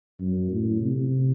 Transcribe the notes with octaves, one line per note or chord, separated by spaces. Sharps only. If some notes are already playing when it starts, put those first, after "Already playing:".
F#2
A2
C3